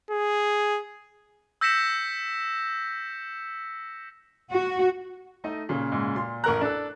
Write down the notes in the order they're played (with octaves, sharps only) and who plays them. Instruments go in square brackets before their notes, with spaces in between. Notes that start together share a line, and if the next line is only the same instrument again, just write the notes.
[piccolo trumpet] G#4
[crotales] E6 G6 A#6 B6 C#7 E7
[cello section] F#4
[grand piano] A3 D#4 D#5
A#2 C#3
[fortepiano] G#2
[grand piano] A#2 [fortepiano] C6
[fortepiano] A1 A#4 A#5 [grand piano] F#6
[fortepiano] D4 A4